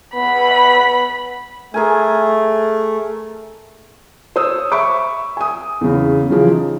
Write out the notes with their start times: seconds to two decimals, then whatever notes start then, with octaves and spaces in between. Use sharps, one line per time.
0.14 B3 B5
1.74 A3 G#4 A#4 G#5
4.36 C5 C#5 D#6 E6
4.72 E5 B5 C#6 D6
5.37 G#5 D#6
5.81 E2 C#3
6.30 C#3 E3 F3 G#4
6.51 D#4